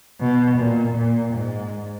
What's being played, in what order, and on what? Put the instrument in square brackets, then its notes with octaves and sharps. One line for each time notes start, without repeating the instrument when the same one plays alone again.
[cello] B2
A#2
A#2
G#2